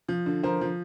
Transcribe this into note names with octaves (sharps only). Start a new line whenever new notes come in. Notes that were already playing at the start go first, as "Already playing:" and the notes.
F3
D3
F3 A#4 C5
F3